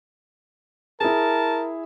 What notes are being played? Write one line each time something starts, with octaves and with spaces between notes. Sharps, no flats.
E4 G#4 A#4 A5